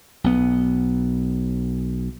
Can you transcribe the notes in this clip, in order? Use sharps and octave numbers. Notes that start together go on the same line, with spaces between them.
B1 B3